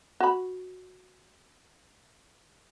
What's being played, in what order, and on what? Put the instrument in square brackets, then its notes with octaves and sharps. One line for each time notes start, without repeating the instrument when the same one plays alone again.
[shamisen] F#4 B5